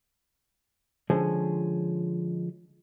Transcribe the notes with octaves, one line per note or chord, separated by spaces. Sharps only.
D3 F3 G#3 C#4